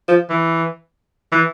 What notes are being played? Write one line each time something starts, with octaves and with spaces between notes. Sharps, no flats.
F3
E3
E3